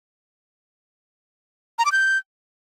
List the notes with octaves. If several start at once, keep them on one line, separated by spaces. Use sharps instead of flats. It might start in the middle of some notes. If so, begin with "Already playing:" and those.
A#5
D6
G6